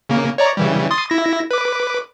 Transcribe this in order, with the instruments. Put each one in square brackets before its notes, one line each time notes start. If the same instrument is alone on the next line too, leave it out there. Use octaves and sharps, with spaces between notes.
[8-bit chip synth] C#3 A#3
C#5 D5 A#5
C#3 E3 G3
C6 D#6 A6
E4 A#6
B4 D6